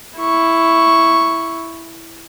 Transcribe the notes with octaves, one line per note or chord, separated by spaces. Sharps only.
E4 C#6